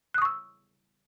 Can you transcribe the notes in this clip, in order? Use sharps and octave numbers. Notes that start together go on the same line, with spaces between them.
C#6 D#6 E6 F#6